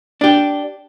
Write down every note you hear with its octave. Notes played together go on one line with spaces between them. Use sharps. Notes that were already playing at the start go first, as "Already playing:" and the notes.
D4 G4